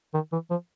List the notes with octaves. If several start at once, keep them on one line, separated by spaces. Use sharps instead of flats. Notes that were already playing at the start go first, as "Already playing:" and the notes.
D#3
E3
F3